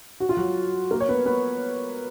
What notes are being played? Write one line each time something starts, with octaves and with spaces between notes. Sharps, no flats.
F#4
F4
F#3 F#4
A#3 A#4
C#5
B3 B4
B3 B4